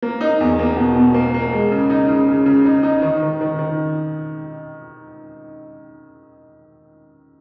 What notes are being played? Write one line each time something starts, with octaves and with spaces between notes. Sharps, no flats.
A#3
D#4
E2
A#3
B2
B2
A#3
A#3
G#3
C#3
D#4
C#3
C#3
C#3
D#4
D#4
D#3
D#3
D#3
D#3